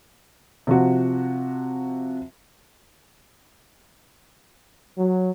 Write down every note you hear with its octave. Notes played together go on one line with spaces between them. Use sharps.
C3 F3 F#4
F#3